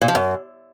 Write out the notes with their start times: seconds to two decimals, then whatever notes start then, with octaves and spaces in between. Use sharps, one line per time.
0.02 A#2
0.08 F3
0.15 F#2